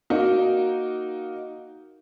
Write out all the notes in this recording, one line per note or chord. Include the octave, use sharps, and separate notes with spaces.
A#3 D#4 F#4 A#4